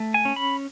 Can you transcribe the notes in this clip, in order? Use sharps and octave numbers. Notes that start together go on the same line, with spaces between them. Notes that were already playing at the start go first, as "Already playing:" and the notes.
Already playing: A3
G#5
C#4
B5